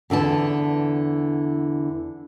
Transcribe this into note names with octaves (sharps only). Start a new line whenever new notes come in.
E2 D3 E3 A5